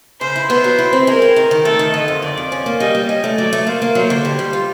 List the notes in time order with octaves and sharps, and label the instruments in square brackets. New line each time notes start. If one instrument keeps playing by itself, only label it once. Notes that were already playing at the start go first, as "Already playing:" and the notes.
[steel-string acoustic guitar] C#3 [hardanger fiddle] C5
[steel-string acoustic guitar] E4
[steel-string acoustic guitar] B3 [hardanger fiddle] C5
[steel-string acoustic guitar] F#3
E4
C4
[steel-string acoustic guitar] G#3 [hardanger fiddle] A#4
[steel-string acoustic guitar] C4
D#3
D#3
[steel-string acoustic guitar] A3 [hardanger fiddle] A4
[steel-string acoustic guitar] D#3
[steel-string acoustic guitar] D3 [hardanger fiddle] D#5
[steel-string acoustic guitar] F2
[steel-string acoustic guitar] F2 [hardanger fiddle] D5
[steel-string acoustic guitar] F2
C#4
A#3
[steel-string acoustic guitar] G3 [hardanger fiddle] D#5
[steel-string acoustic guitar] G3
[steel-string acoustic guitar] C#4 [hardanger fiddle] D#5
[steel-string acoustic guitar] A3
[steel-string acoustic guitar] F#3 [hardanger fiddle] D5
[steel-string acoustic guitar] A3
[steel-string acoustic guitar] A#3 [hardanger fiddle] C5
[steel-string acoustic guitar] A#3
[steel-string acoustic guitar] F#3 [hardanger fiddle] C5
[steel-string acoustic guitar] D3
G3
G3
F4